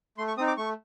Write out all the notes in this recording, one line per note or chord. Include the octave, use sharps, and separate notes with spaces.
A3 C6
C#6
C4 D#4 D#6
D6
A3 C#6